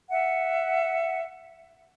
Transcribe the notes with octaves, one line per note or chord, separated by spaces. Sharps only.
E5 F#5